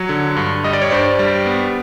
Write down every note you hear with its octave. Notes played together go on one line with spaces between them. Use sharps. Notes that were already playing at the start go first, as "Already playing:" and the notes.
Already playing: F#3 C#5
D3
G2
G3 D#5
D5
C#5
G2 C5 D5
G3
B3